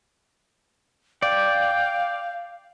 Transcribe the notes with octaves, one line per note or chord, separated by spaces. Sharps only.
D5 F5 G5